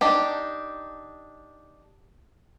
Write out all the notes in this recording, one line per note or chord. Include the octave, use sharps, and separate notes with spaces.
D4 D#4 G4